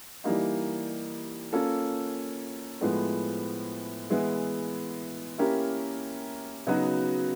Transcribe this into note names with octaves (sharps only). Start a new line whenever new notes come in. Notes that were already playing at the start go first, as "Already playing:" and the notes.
E3 G3 A#3 D#4
A#3 C#4 F4 A4
A2 F3 G#3 B3
E3 G#3 B3 E4
A#3 C#4 E4 G4 A#4
C#3 F#3 B3 D#4 F#4